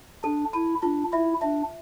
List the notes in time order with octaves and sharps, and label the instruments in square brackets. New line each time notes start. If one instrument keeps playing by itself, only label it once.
[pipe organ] D4 [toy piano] A4
[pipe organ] E4 [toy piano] A5
[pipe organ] D4 [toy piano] F4
[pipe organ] E4 [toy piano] E5
[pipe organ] D4 [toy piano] E5